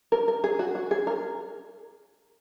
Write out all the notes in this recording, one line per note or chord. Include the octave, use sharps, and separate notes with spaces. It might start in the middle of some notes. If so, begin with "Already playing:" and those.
A#4
A#4
G#4
F#4
F#4
G#4
A#4